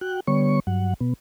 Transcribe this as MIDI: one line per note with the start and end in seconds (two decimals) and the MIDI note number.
0.01 0.20 66
0.01 0.20 79
0.01 0.20 90
0.27 0.60 50
0.27 0.60 55
0.27 0.60 59
0.27 0.60 73
0.27 0.60 85
0.67 0.94 43
0.67 0.94 54
0.67 0.94 78
1.00 1.13 47
1.00 1.13 59